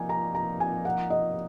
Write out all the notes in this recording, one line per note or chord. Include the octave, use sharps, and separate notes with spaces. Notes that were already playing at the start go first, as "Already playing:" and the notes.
Already playing: F3 A#3 D#4 G#5
A#5
A#5
G#5
F#5
D#5